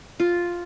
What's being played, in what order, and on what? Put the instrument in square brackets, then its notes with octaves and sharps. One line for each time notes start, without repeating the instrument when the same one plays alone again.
[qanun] F4